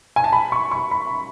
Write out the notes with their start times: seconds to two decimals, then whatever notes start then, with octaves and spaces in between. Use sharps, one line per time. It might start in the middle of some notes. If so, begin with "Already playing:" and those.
0.16 G#5
0.24 A5
0.33 B5
0.52 C#6
0.71 C#6
0.91 B5